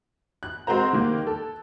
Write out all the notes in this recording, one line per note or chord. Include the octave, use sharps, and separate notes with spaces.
F#6
G#3 C4 F#4 C5 A#5
D#3 G3 A#3
A4